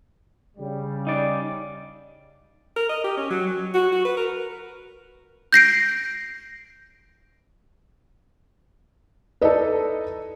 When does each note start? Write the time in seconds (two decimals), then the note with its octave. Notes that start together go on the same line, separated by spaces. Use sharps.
0.58 C#3 G3
1.07 D#4 D5
2.76 A#4
2.89 D#5
3.04 G4
3.17 C#4
3.30 F#3
3.47 F#3
3.74 F#4
3.92 F#4
4.05 B4
4.17 A#4
5.53 G6 A#6 C7 D7
9.41 D#4 E4 A4 B4 D5 D#5